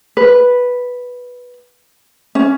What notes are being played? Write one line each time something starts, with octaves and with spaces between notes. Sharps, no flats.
B4
C#4